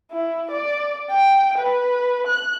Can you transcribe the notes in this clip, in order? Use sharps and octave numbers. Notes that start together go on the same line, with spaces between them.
E4
D5
G5
B4
F#6